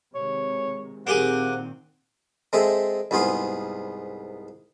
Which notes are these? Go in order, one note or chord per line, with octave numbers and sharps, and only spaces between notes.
C3 D#3 G#3 C#5
A#2 D#3 A#3 C4 G4 G#4 F#5
G#3 C4 G#4 A4 E5
C2 G#2 B3 F4 G#4 C6